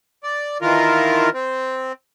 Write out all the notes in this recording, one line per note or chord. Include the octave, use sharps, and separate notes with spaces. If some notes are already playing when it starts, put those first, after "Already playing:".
D5
D#3 E3 F4 A#4
C4